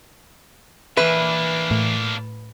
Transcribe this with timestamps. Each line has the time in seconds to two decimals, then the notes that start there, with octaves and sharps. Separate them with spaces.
0.97 E3 A#3 D4 B4 E5
1.71 A2